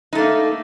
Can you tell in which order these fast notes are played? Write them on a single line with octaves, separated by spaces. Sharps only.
D#4 A3 A#3